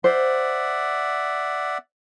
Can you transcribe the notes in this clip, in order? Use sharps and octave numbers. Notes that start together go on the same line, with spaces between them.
C5 D5 E5 F#5